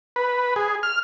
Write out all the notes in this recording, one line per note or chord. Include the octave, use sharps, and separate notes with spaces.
B4
G#4
F6